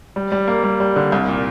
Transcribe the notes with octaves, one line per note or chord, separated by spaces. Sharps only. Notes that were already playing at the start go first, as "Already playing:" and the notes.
G3
G3
A#3
G3
G3
D3
C2
A#2